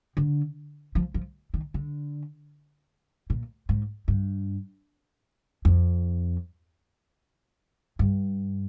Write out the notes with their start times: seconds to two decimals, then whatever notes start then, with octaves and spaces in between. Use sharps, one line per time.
0.17 D3
0.95 F3
1.14 F3
1.54 D#3
1.74 D3
3.30 A#2
3.69 G#2
4.08 G2
5.65 F2
7.99 G2